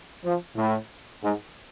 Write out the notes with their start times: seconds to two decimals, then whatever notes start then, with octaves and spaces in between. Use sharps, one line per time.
0.24 F3
0.56 A2
1.22 G#2